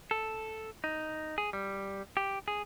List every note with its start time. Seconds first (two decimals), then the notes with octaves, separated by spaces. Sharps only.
0.11 A4
0.84 D#4
1.38 G#4
1.53 G3
2.17 G4
2.48 G#4